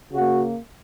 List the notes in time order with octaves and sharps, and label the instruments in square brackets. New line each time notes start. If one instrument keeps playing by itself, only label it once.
[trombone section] C#3 A#3 F#4